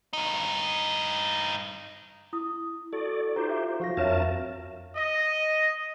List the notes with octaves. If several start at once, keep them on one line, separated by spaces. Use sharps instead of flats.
G2 D#4
E4 D#6
F#4 A4 D5
D#4 F4 G4 C5 A#5
E5
F3 F#4 F5 A#6
F2 D4 A#4 C#5 E5 A5
D#5